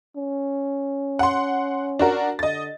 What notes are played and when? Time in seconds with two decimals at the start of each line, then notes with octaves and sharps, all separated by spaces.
0.16 C#4
1.19 F#5 C6
1.99 D4 F#4 A#4
2.39 D3 D#5 A6